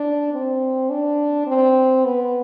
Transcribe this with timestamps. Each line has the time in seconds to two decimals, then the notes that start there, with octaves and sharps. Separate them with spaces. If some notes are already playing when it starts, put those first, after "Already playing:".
Already playing: D4
0.33 C4
0.90 D4
1.47 C4
2.05 B3